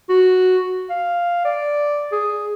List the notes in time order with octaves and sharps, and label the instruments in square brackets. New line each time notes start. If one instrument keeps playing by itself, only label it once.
[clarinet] F#4
F5
D5
G#4